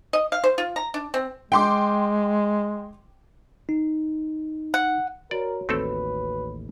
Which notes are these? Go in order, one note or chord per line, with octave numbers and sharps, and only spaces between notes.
D#5
F5
C5
F4
A#5
D4
C4
G#3 G5 C6 D6
D#4
F#5
F#4 A#4 C#5 D5
A1 D#2 A3 C4 A4 B4